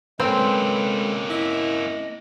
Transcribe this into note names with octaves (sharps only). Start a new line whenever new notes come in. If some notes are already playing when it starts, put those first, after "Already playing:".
G#3 A#3 C4 C#4 A4 B4
E4 D#5